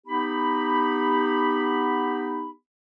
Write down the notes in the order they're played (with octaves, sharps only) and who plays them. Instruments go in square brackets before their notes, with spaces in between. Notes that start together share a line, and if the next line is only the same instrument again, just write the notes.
[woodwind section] B3 D#4 G4 B5